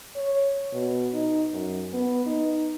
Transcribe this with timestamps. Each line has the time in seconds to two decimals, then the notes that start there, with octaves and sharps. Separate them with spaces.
0.16 C#5
0.72 B2
1.14 D#4
1.53 F#2
1.93 B3
2.26 D#4